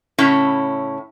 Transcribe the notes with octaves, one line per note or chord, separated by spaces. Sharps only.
A2 C#3 C#4 E4